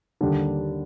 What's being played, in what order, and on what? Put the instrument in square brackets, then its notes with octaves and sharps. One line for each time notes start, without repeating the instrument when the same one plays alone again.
[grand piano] D#2 D3 G3 D4